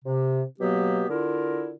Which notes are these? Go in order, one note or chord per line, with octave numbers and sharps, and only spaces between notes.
C3
B2 F#3 A#3 B3 G4
D3 E4 F4 A#4